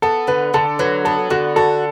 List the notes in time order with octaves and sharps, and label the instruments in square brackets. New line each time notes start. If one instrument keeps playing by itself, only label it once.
[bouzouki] B3 [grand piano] A4
[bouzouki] D3 [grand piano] B4
[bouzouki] D3 [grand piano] A4
[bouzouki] F#3 [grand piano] B4
[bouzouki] B3 [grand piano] A4
[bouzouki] D3 [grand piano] F#4
[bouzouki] F#4 [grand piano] A4